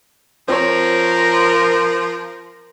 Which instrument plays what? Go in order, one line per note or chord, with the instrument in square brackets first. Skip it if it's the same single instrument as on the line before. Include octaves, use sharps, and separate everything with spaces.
[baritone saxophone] F3 [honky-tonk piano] C4 C#5 [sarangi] A#4